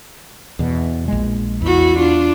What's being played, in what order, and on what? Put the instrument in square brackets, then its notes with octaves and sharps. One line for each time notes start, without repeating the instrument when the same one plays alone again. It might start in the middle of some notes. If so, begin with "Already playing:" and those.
[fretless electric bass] E2 B2
A#1 G#3
[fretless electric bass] E2 [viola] E4 F#4
[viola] D4 F4